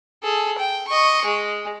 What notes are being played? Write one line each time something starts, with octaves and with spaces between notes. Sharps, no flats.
G#4 A4
G5
D#5 C#6
G#3